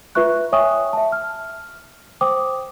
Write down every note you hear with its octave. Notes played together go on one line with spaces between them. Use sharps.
F4 B4 E5 C#6 F#6
C#5 E5 G5 G#5 C#6 D#6
E5 A5
F6
C5 G5 D6 D#6